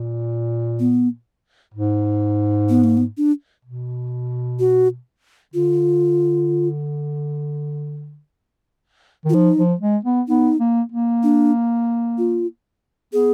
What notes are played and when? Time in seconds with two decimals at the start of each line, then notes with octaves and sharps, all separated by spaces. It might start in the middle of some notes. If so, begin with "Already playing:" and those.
Already playing: A#2
0.80 B3
1.74 G#2
2.69 B3
2.84 A#3
2.97 B3
3.17 D4
3.65 B2
4.59 F#4
5.54 D3 F4
9.25 D#3
9.29 F4
9.34 F3 D#4
9.57 F3
9.81 G#3
10.05 B3
10.28 B3 D#4
10.60 A#3
10.92 A#3
11.23 D4
12.18 F4
13.13 B3 G#4